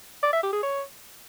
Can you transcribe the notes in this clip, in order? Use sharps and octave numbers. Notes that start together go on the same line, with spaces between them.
D5
E5
G4
G#4
C#5